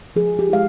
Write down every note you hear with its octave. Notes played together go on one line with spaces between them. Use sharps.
F3 G#4
G4
G#3 E4 F5